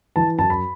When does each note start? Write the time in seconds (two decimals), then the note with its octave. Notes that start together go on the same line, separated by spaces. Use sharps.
0.16 E3 A5
0.38 F#2 A5
0.50 B5